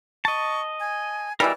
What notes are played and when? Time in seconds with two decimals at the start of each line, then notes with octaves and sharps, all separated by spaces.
0.25 D#5 A5 C#6
0.80 G#5
1.40 B2 E3 G3 A#4 D5 E6